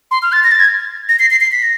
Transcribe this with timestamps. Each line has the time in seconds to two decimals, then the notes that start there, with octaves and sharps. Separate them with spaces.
0.11 C6
0.22 F6
0.32 A6
0.44 A#6
0.51 A6
0.60 G#6
1.09 A#6
1.19 C7
1.31 C7
1.41 C7
1.52 B6
1.63 A#6